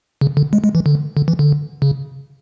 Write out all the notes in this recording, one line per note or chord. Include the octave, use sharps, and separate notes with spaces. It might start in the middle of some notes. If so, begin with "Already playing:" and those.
C#3
D3
G#3
G#3
E3
D3
D3
E3
D3
C#3